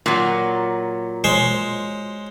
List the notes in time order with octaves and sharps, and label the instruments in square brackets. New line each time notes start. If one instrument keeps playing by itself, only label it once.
[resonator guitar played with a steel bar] A#2 F#3
[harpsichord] G#3 C5 C#5